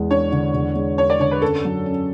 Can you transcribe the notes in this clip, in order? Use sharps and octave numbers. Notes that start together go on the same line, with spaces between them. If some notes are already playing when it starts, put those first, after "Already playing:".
Already playing: E2 G#3
D4 C#5
D3
E2
G#3
D4 C#5
D5
D3 C#5
B4
F#2 A4
F#3
C#4